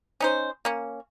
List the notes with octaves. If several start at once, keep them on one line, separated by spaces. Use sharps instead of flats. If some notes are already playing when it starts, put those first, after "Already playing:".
C#4 D#4 C5
A#3 C#4